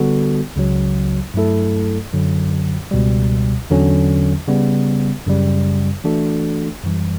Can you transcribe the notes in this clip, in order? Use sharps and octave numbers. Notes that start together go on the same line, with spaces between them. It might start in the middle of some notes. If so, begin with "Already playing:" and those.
Already playing: D3 G3 B3 F#4 A4
C#2 C#3 F#3
G2 F#3 A3 E4 A4
F#2 D3 F#3
C#2 B2 G3
E2 D3 F#3 C#4
C#3 G3 B3
F#2 C#3 G3
E3 A3 D4 F#4 A4
F#2 E3 G3